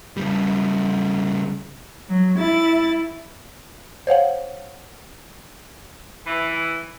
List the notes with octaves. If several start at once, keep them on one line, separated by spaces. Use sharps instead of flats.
C#3 G3
F#3
E4 A6
C5 C#5 F5 F#5
E3